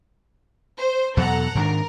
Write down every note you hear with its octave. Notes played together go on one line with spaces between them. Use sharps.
C5
E2 B2 F#3 A4 F#5 A#5
G#2 D#3 D4 A#4